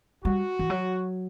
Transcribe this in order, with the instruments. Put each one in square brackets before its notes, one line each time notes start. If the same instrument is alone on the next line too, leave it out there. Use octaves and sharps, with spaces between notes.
[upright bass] G3 [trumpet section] F#4
[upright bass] E3
F#3